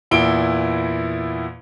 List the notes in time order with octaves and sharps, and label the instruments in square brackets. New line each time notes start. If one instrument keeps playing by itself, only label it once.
[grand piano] E2 A#2 E4 D7 G7